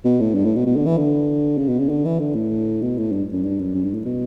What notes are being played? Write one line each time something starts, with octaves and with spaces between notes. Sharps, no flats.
B2
A2
G2
A2
B2
B2
D3
E3
D3
C#3
B2
C#3
D3
E3
D3
A2
B2
A2
G2
F#2
G2
F#2
F#2
G2
A2
B2